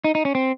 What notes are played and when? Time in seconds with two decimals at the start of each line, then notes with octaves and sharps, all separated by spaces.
0.04 D#4
0.15 D#4
0.25 C#4
0.35 C4